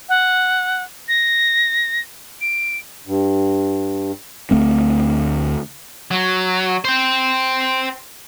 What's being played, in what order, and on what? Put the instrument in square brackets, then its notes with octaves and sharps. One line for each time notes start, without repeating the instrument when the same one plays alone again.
[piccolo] F#5
A#6
D7
[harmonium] G2
[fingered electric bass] D2 A3 C4
[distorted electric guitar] F#3
C5 G5